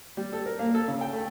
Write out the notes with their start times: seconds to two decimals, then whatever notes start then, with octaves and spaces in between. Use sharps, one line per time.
0.17 G3
0.33 A4
0.46 A#4
0.59 A#3
0.75 A4
0.88 C#3
1.01 G5
1.13 A3